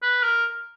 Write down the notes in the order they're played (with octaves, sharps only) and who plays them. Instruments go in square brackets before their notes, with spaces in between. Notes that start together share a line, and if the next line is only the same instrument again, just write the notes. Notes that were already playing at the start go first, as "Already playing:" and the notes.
[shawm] B4
A#4